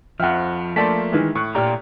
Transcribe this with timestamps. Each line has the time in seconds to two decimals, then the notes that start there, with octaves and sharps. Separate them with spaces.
0.20 F2 F3 E5 F#5 F6
0.76 A3 A#3 D5 A5 C6 B6
1.12 D#3 E3 G#3
1.35 A2 C#6 F#6
1.55 A#2 G4 D5 A#5 F6